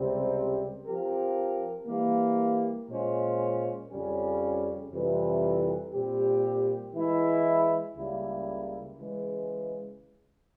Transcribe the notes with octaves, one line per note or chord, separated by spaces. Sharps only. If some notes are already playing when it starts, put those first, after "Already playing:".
Already playing: C#2 C3 G3 C4
F3 C4 G4 A#4
E3 G3 A#3
A#2 G#3 C#4 F4 C5
F2 C#3 G3 C#4
F2 C3 E3 G3
A#2 G3 C4 G4
E3 G#3 E4
C#2 C#3 G3 A#3 E4
C#3 E3 G#3